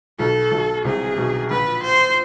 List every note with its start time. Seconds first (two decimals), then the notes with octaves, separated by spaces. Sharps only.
0.19 B1 B2 A4
0.52 B1 B2
0.84 C2 C3 G#4
1.17 B1 B2
1.51 A#1 A#2 B4
1.83 C5